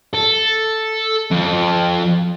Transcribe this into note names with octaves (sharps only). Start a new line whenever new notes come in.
A4
F2